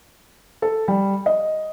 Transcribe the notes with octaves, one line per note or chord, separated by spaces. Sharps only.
A4
G3
D#5